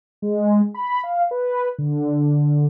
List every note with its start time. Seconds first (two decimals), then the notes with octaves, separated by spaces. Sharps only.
0.22 G#3
0.74 B5
1.04 F5
1.31 B4
1.78 D3